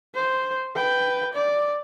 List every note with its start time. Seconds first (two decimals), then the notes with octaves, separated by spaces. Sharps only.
0.15 C5
0.76 B4 G5
1.34 D5